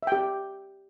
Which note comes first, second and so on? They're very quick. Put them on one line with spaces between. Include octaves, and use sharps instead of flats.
E5 G5 G4